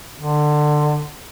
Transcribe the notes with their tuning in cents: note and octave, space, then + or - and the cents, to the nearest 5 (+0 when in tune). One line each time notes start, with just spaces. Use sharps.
D3 +25